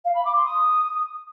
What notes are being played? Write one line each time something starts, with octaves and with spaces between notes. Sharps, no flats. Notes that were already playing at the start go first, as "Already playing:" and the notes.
F5
B5
D6
C6
D#6